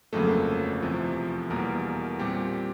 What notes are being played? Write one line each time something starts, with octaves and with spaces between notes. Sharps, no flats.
G1 F2 C#3 F#3 A3 A#3 A4
E2 C3 F3
E2 B2 G3 A#3 A#4
A#2 G3 C4 G4